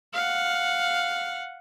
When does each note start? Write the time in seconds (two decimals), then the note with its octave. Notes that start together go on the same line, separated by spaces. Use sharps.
0.14 F5 F#5